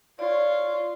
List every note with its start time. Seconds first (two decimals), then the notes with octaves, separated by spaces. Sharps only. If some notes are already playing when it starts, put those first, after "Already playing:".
0.19 F4 C#5 D5